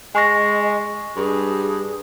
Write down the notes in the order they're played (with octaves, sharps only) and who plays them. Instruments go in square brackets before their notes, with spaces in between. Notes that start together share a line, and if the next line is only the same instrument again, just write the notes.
[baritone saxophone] G#3 [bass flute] D#5 [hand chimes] G#5 C#6 A#6
[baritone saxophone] G2 [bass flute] G#4